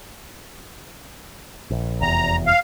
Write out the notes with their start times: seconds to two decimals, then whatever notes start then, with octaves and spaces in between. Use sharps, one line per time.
1.70 A#1
2.02 F1 E2 A#5
2.46 F5